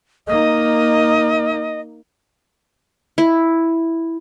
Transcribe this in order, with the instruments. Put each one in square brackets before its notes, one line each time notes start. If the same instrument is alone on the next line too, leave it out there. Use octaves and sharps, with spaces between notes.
[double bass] A#3 D#4 [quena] D#5
[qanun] E4